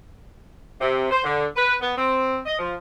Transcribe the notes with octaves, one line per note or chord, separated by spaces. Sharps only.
C3
C5
D3
B4
B3
C4
D#5
F3